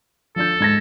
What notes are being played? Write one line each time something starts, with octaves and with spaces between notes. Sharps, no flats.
F3 D4 A4 G6
G#2 G#6 A#6